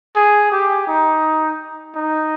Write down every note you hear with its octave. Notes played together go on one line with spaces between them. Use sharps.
G#4
G4
D#4
D#4